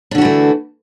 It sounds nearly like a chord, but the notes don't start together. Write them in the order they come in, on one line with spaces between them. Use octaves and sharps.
D4 D3 F#4 E3 A3